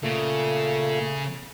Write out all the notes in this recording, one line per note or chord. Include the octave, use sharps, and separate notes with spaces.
A#2 C#3 A3